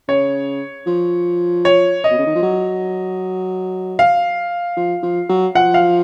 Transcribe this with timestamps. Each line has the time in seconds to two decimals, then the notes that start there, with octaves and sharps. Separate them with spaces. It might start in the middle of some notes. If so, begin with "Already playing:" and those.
0.08 C#3 C#5
0.87 F3
1.65 C#5
2.04 D#5
2.11 B2
2.18 C#3
2.26 D#3
2.35 F3
2.43 F#3
3.99 F5
4.77 F3
5.03 F3
5.29 F#3
5.55 F3 F#5
5.74 F5